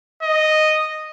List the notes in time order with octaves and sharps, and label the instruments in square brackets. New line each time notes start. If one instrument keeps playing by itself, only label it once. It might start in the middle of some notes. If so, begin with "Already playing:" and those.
[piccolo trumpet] D#5